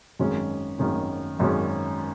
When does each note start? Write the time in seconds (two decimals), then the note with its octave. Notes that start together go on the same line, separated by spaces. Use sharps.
0.19 G#1 F#2 D#3 G#3 C#4
0.79 G#1 F#2 D#3 G#3 C#4
1.39 G#1 F#2 D#3 G#3 C#4